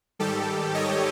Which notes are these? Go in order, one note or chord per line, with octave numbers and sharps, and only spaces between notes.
G#2 D#3 G3 G4 A4
C#5 D#5